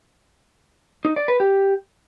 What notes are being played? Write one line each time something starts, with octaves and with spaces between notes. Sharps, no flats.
D#4
D5
B4
G4